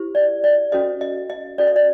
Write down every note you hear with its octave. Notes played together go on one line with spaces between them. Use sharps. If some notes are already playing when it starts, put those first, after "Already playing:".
Already playing: E4 G4 C5
D5
D5
C#4 F#4 A4 C5 D#5
D#5
D#5
C#4 F#4 A4 C5 D5
D#5
D5